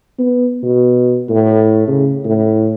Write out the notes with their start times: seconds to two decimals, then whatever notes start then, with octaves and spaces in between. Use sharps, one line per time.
0.19 B3
0.63 B2
1.30 A2
1.87 C#3
2.25 A2